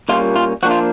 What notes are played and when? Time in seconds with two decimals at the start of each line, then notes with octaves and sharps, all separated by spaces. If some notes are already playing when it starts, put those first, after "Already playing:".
0.09 A#2 G3 A#3 C#4 F4
0.36 F4
0.63 F3 A#3 D4 F#4
0.71 F4